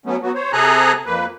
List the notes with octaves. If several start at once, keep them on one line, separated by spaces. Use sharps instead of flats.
F#3 A3 B3 C#4
F#3 B3 F#4
C5 C#5
C3 G#4 A4 G#5 A#5 F#6
F2 A#3 B4